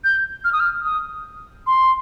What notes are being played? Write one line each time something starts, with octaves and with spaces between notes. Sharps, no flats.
G6
F6
D#6
F6
D#6
C6